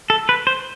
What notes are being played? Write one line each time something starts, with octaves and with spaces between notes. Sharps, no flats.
A4
B4
C5